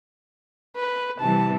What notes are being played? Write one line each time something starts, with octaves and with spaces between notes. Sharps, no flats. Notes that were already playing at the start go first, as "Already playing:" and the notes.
B4
C3 E3 G3 A5